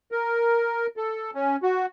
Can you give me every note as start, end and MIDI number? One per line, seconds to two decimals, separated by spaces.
0.12 0.87 70
0.97 1.31 69
1.35 1.56 61
1.63 1.86 66